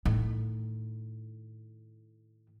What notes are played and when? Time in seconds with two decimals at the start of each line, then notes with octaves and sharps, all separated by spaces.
0.05 A2 D#3